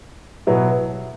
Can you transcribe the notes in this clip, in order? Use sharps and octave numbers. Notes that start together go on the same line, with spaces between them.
B2 F#3 B3 E4